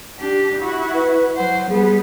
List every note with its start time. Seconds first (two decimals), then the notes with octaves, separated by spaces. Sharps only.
0.19 D4 G4
0.59 E4 F#4
0.94 B4
1.36 F#3 C5 F#5
1.70 G3 B3 G#4